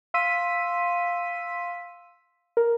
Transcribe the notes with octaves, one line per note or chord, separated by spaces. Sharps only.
F5 C6 E6 B6 D#7
A#4